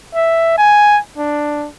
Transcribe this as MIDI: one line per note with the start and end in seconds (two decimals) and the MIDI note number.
0.14 0.57 76
0.58 0.99 80
1.17 1.68 62